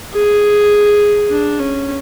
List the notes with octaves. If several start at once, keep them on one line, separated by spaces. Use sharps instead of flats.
G#4
D4
C#4